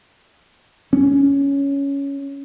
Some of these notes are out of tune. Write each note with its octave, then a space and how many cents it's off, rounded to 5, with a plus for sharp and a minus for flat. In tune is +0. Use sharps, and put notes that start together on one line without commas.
C#4 +10